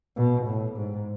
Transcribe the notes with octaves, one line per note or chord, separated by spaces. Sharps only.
B2
A2
G#2